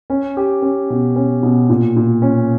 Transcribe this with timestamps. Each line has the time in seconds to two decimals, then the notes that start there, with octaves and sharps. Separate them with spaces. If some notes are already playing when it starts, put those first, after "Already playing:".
0.10 C#4
0.37 G4
0.62 C#4
0.90 B2
1.16 C#4
1.43 B2
1.70 A#2
1.96 A#2
2.22 C#4